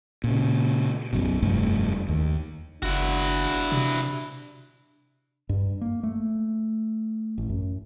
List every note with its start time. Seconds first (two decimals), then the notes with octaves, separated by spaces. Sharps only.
0.24 A#2 C#3
1.13 B1 F#2 B2
1.42 F1 G2 A3
2.08 D#2
2.82 F#1 D4 E4 F#4
3.72 C3
5.49 G2
5.81 A#3
6.03 A3
7.38 A1
7.50 F#2